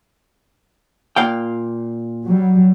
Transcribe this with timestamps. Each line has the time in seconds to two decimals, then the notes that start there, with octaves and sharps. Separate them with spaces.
1.16 A#2 F5 G5
2.25 F#3 G3